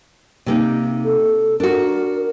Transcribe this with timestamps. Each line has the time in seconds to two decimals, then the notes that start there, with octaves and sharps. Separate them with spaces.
0.46 C3 A#3 D#4
1.05 A4
1.60 D4 F#4 A#4